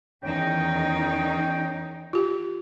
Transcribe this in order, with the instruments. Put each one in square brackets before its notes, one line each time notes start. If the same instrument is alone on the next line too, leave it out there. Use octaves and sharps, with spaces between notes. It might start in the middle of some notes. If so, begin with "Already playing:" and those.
[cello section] E2 D#3 D#4 [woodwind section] C#4 G5
[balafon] F4 G4